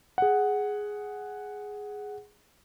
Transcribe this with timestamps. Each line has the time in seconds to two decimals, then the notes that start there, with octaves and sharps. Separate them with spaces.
0.18 G#4 F#5